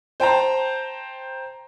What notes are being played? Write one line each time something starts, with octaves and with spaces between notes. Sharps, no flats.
C5 G5 A5 A#5